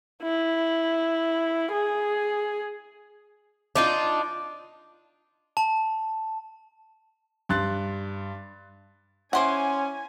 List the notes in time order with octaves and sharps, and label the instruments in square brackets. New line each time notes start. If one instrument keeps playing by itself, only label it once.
[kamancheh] E4
G#4
[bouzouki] D4 D#4 F4
[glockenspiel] A5
[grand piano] G2 C6 F#6 A6
[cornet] C#4 [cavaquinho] E4 C6 D6 [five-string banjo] C5 F#5 [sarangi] G#5